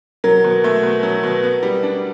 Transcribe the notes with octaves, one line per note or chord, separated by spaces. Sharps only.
F#3 A#4
B2
A3
B2
F#3
B2
B3
G3
D4